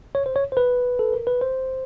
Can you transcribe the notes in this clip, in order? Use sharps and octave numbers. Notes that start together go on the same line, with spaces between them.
C#5
C5
C#5
C5
B4
A4
A#4
B4
C5